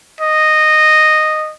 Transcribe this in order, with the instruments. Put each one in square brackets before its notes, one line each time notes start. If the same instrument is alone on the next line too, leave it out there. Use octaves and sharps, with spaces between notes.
[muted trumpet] D#5